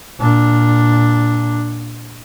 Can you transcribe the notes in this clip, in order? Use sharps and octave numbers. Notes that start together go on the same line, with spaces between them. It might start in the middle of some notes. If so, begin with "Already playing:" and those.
A#2 D4